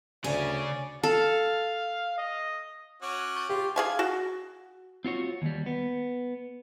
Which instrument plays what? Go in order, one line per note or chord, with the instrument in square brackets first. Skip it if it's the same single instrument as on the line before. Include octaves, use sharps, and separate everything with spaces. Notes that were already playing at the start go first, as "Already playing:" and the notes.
[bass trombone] D2 [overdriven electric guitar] C#3 C#4 [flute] D5 [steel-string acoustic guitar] G#5
[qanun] A4 [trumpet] F5
[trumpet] D#5
[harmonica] C#4 F#4 [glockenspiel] D6 D7 D#7
[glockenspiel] C#6 G6 A6
[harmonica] F4 [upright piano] G4
[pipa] G#4 F5 G#5
F#4
[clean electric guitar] C4 F4 F#4 C#5
D#2 G3
B3